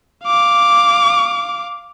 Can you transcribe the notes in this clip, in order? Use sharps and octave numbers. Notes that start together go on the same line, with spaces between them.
F5 D6